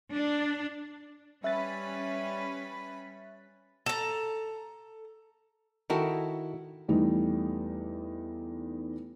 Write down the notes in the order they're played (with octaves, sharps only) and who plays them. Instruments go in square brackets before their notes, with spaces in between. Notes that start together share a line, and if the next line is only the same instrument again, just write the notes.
[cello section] D4
[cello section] G3 C#4 [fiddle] B4 B5 [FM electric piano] E5 F#6 A6
[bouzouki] A4 A#5
[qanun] D#3 E4 [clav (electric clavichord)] F#4 A4 A#4
[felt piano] E2 G3 A3 D#4 E4